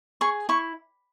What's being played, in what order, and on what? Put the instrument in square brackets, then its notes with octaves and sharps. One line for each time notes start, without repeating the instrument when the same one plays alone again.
[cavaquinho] G#4 C#6
E4 C#6